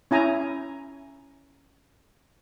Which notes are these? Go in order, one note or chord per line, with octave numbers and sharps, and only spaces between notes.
C#4 E4 G#5 A#5